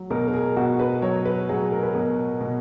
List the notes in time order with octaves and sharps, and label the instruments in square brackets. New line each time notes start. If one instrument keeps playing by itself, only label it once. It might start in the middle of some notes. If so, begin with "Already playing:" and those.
Already playing: [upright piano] F#3
B2 A#4
A#4
G#4
B2 F#4
B4
F#3 C#5
B4
F#3 G#4
A#4
B4
B2 A#4
B2